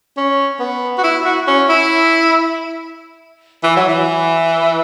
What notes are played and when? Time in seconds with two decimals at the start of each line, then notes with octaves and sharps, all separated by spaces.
0.17 C#4
0.60 B3
0.98 F#4
1.04 E4
1.25 F#4
1.47 C#4
1.69 E4
3.63 E3
3.76 F#3
3.89 E3